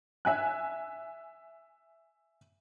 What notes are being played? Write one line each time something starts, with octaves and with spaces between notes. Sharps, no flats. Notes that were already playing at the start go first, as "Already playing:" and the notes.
E5 G#5 F#6